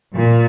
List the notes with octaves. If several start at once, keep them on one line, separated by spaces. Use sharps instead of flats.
A#2